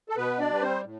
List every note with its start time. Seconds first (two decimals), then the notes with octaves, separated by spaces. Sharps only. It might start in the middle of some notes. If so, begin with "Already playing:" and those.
0.09 A4
0.16 B2 B3 B4
0.39 D4 D5
0.50 G3 B4
0.62 C4 C5
0.84 A2